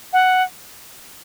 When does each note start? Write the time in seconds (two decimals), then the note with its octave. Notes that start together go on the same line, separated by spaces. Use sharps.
0.13 F#5